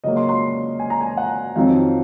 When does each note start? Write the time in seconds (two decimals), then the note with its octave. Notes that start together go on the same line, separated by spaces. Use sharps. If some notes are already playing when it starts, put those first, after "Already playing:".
0.04 C#3 F#3 A#3 D#5
0.17 C6
0.29 C6
0.79 G#5
0.90 A#5
1.01 G#5
1.17 F#5
1.56 F2 D#3 F#3 C4 D#4 F5